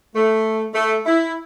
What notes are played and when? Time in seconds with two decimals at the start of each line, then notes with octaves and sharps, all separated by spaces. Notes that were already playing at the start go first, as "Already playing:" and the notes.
0.15 A3
0.75 A3
1.06 E4